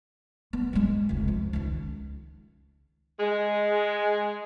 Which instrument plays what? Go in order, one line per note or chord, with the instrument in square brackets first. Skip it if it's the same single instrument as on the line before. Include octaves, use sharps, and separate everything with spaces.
[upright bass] B3
F#3 G#3
F1 C#2
F3
C#2 D#3
[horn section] G#3